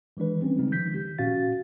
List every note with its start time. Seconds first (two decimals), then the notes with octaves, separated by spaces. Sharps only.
0.17 D#3 E3 G#3 D4 B4
0.40 G3 C4 C#4
0.59 C#3 G#3 C4 D#4
0.71 D#3 F3 G6 B6
0.94 G4
1.18 A#2 C#4 F#4 F5 A6